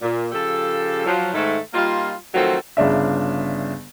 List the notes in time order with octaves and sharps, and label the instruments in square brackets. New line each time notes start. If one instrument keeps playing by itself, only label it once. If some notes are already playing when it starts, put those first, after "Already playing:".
[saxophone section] A#2
C#3 F3 G4 A4
F3 F#3
G#2 D#3 A3
G3 A#3 D#4 F4
D#3 F3 F#3 A3 C4 A4
[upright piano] G1 C#3 D4 E5